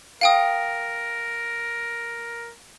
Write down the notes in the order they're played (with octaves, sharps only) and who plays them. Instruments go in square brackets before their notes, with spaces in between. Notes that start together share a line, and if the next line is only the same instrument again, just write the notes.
[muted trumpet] A#4 [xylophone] F5 G5 D#6